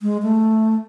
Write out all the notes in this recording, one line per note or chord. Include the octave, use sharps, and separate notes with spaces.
G#3
A3